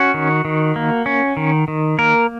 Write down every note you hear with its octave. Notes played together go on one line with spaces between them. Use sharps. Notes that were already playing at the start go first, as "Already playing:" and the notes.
Already playing: C#4 F#4
D#3
D#3
A#3
C#4
D#3
D#3
A#3 A#4